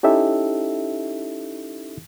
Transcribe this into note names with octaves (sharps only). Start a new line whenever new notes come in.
C#4 D#4 E4 G4 A4 E5